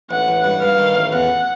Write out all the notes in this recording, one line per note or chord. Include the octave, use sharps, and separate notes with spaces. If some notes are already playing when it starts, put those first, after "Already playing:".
A1 F#5
A1
G2
G2 F5
D#3
A1
E2 F#5